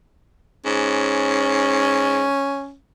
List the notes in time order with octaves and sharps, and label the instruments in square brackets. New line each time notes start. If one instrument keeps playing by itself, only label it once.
[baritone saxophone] G#2 [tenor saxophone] C#4